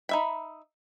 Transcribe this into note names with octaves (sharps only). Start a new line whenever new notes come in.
D#4 E5 B5